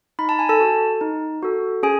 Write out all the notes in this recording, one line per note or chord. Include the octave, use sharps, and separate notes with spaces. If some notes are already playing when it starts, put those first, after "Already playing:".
D#4 B5
A5
G#5
A4 A5
F#4 A4
D#4
F#4 A4
C#4 G#4 G#5